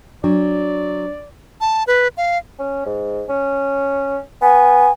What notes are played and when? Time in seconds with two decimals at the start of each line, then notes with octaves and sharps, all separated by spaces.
0.24 F#3 D4 D5
1.61 A5
1.87 B4
2.17 F5
2.59 C#4
2.85 G#2
3.29 C#4
4.42 B3 G#5